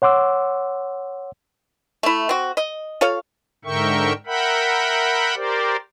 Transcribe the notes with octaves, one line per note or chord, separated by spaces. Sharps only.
C#5 F#5 C6 D6 E6
A3 E4
C4 F#4
D#5
F4 A4 C#5 F5
G#2 D3 A#4 E5 G5 C#6
A#4 E5 F#5 G5 B5
G4 A#4 C5 D5